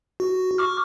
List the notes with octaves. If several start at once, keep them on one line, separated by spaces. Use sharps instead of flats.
F#4
C#6 D6 F6